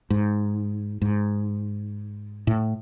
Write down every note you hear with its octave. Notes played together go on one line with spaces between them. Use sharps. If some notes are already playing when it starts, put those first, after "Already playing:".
G#2
G#2
A2